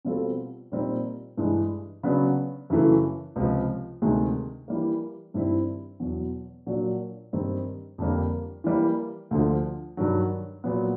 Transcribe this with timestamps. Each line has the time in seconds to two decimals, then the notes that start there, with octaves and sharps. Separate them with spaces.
0.05 B2 G3 C4 F4 A4
0.72 A#2 G3 C4 D#4
1.37 G2 E3 G#3
2.03 C#3 F#3 B3 D4
2.70 F#2 C#3 E3 A3
3.36 C#2 C3 F3
4.02 D2 C3 D#3 G#3
4.68 E3 G3 A#3
5.34 G2 D#3 G3 C4 E4
6.00 E2 B2 F#3
6.67 A#2 F#3 A#3 D4
7.33 G2 D#3 G3 C4 D#4
7.98 F2 D3 G3 A#3
8.64 E3 G3 A#3
9.31 D2 D3 F3
9.97 G2 D#3 F#3
10.64 A#2 F#3 B3